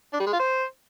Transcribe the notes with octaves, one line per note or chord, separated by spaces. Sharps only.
D4
G3
G#3
F4
C5